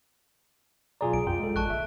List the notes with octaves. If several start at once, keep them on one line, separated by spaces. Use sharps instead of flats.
B1 F#2 F4 G#4 D5 A#5
C2 D7
F#2 F4 G#4 G5
G#3 A4
A#1 A5 C#6 F#6
G1 E5